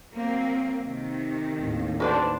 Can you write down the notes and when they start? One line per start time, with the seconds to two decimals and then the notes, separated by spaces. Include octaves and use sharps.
0.12 F#3 A#3 C4
0.82 C3 D#3
1.60 A1 D#2
2.00 D4 F#4 B4 C5 D5